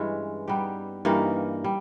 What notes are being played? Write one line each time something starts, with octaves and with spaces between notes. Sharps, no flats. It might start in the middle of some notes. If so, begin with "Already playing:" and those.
Already playing: G2 E3 G#3 C#4
G3 B3 D#4 G4
G2 E3 A#3 D#4
G3